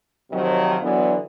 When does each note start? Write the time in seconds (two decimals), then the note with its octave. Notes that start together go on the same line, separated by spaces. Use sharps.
0.32 C3 D#3 F3 F#3
0.82 D3 E3 F#3 B3